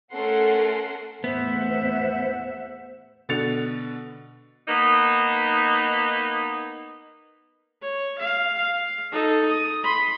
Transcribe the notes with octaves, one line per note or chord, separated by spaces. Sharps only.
A3 C#4 A4 A#4 F#5 C6
E2 A2 B3 C5 E5 F#5
B2 D3 A6 C#7 F7
A#3 B3 D#4
C#5
F5
F5
D#4 A4
D#6
B5 C6